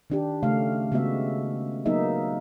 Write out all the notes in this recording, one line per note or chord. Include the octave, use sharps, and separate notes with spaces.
D#3 D4 G4
C#3 A3 F5
C#3 G#3 B3 F#4 E5
F#3 A#3 B3 D#4 G#4 E5